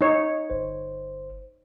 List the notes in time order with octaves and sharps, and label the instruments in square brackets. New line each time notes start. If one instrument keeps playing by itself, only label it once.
[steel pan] D#4 C#5
[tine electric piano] G1 C5